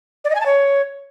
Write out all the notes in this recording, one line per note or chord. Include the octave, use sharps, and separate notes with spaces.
D5
D#5
G#5
A5
C#5